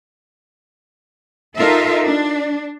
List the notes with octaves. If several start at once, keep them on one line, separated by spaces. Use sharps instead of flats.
D#4 F4 A4 A#4 E5
D4